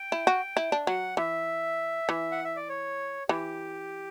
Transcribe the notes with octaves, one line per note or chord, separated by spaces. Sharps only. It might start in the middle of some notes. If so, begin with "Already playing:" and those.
Already playing: G5
E4
F#4
E4
D4
F#3 F#5
E3 E5
E3
F#5
E5
D5
C#5
E3 G4